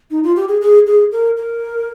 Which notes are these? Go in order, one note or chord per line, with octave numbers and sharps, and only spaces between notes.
D#4
F4
G4
G#4
G#4
G#4
A#4
A#4